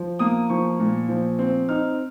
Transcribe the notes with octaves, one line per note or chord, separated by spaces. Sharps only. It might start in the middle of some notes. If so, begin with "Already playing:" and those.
Already playing: F3
A#3 D#6
F3 C#6
A#2
F3
C4
D#4 F6